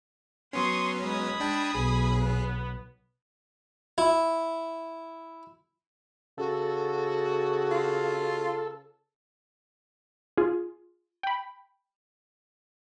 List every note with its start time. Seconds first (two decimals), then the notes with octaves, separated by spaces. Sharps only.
0.53 F#3 B3 C#4 C6 C#6 D#6
1.03 G#3 B5 D#6 G#6
1.40 D4 G5 A5
1.75 B1 G#4
2.21 B3
3.98 E4
6.38 C#3 F#4 A4
7.71 F4
10.37 F4 G#4
11.23 G5 B5